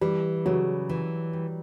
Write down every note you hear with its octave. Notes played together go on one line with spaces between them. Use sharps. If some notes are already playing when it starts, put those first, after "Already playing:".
E3 G3
C#3 F#3
E3
G3